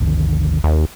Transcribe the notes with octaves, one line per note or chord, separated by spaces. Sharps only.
G1 D2 D#3
D#2